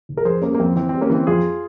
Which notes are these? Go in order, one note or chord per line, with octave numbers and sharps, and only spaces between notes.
F1
A#4
F2 G#4 C5
G3 A#3 C#4
A#3
F2 C4
E3 C4
C4
G3
A#3 C#4
E3 C4
F2 F4 G#4